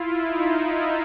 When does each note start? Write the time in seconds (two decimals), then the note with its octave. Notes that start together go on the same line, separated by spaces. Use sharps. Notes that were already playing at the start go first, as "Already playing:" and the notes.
Already playing: E4 F4
0.22 D#4